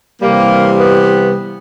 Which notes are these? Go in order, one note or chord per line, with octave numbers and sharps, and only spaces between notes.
C3 E3 G3 A#3
B3